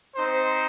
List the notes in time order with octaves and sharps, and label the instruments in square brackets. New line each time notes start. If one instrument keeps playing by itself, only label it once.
[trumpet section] C4 D#4 C5